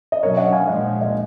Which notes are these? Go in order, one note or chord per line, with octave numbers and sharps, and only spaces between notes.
D#5
B2 F#3 C#4 A#4 C#5
D#5 F#5
F5 G#5
A#2 F3 G#3 D#5 F#5
D#5